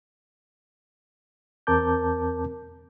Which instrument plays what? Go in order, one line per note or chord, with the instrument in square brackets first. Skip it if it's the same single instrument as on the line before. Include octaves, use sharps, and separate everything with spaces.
[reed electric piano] E2 C4 A#4 A5 D6 G6